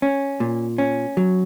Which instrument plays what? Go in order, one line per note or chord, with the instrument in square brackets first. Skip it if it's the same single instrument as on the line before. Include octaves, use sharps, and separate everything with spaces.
[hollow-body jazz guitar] C#4
A#2
C#4
F#3